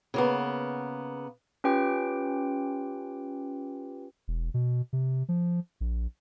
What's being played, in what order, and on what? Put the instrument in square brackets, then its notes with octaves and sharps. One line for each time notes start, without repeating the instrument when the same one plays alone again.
[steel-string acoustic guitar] C#3 A#3 B3
[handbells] C#4 F4 G4 B4 G5
[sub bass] E1
B2
C3
F3
A#1